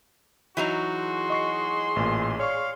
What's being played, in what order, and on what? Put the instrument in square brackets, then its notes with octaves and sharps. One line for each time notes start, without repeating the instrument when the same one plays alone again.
[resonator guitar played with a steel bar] E3 F#3 D#4 [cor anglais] F#4
[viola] G#4 C6
[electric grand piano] D#5 C#6 C7
A1 A#2
[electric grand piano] C#5 D5 C#6 [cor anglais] F5